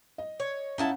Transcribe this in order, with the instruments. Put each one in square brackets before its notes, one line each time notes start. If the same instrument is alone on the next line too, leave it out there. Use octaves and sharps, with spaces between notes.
[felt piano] D#5
[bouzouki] C#5
[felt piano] C#4 F5 F#5 [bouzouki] D#4 E4 A5